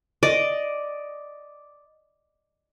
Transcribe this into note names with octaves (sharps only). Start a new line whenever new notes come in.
D5 D#5